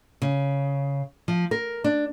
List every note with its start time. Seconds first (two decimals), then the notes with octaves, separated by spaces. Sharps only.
0.22 C#3
1.28 F3
1.51 A#4
1.84 D4